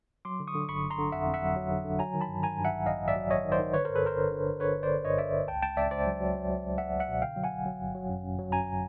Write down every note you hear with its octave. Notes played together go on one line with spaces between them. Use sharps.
F#3 C6 D6
D3
C#6 D#6
D3
G1 B5 C#6
G1
A#5 C6
D3
F2 E5 F#5
F2
E5 F#5
F#3
F#3
D3
D3
F#3 G#5 A#5
D#3
A5 B5
G2
D#3 G#5 A#5
G2
E5 F#5
A1
A1 D#5 F5
A1
D5 E5
F#3
A1 C#5 D#5
D#3
C5 D5
D#3
D3 B4 C#5
G2 A#4 C5
A4 B4
G1 A#4 C5
D3
D3
D3
D3 B4 C#5
G1
C5 D5
G1
G2 C#5 D#5
D3 D5 E5
G1
C#2 G5 A5
C#2 G5 A5
C#2 D5 E5
C#2 C5 D5
F#3
F#3
F#3
F#3
C#2
F#3 E5 F#5
C#2
E5 F#5
B2
D3 F5 G5
F#3
F#5 G#5
G1
F#3
G1
F#3
F#2
F#2
F#3
F#2 G#5 A#5